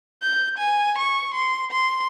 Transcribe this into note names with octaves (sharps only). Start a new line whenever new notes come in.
G6
G#5
C#6
C6
C6